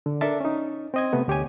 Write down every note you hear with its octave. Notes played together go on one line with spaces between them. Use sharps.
D3
D4 A4 A#4 E5 A5
C#4 D#4
C4 D#5 G#6
C3 A3 B3
D2 G4 C#5 G#5